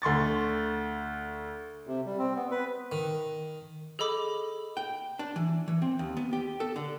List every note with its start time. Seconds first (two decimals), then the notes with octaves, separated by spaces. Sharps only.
0.02 D2 C6 C#6 A6
1.87 C3
2.06 G3
2.18 C4
2.36 B3
2.51 B4
2.92 D#3
3.99 G#4 A4 D#5 B5 D6 F#7
4.77 G5
5.19 D4
5.36 E3
5.68 E3
5.82 C4
5.99 D#2
6.17 B3
6.33 G4
6.60 A4
6.76 D3